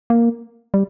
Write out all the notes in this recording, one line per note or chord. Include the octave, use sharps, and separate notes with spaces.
A#3
G3